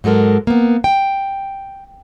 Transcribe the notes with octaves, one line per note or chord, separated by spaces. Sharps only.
G#2 F#3 G#3 A4 A#4
A#3 B3
G5